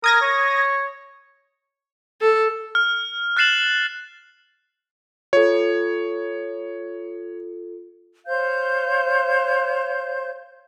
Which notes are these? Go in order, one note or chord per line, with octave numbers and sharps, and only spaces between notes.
A#4 D#6 G#6 A#6
C#5
A4
F6
F6 F#6 A6 C7 E7 F#7
F4 A4 C#5
C5 C#5 F5 G6